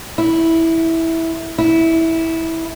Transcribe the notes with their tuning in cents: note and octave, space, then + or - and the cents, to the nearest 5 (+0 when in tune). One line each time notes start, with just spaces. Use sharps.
E4 -10
E4 -15